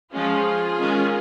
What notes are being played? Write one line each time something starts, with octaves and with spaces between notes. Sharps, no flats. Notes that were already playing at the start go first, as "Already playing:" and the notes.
F3 G#3 C#4 F4 G#4
D#3 G#3 C#4